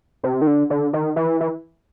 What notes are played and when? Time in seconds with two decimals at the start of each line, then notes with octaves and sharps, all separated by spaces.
0.23 C3
0.42 D#3
0.47 D3
0.70 D3
0.93 D#3
1.16 E3
1.40 E3